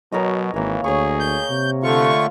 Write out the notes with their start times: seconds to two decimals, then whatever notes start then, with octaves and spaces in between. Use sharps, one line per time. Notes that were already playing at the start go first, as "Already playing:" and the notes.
0.12 B2 F#3 A#4 C#5 D#5
0.54 G#1 E3 A#3 C#5
0.84 D2 G#4 C#5 C#6
1.20 G6
1.50 C3
1.83 D3 A3 F4 F5 C#6